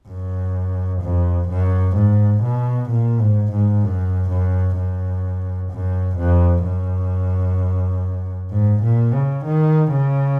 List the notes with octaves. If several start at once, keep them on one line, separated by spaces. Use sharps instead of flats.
F#2
F2
F#2
G#2
B2
A#2
G#2
G#2
F#2
F#2
F#2
F#2
F2
F#2
G#2
A#2
C#3
D#3
C#3